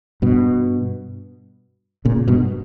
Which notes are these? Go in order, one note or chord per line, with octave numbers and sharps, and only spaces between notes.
G2 B2
A#2 C#3
G2 B2